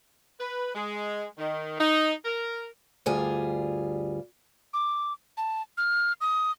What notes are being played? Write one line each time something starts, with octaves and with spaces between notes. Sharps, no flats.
B4
G#3
D#3
D#4
A#4
D2 G2 G3 F4 G#4
D6
A5
F6
D#6